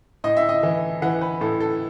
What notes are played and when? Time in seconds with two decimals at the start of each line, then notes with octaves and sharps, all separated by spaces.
0.24 A2 D#5
0.37 E5
0.49 D#5
0.63 E3 E5
1.02 E3 F#5
1.21 B4
1.41 A2 A4
1.60 A4